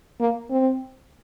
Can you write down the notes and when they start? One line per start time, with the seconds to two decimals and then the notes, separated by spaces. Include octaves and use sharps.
0.20 A#3
0.50 C4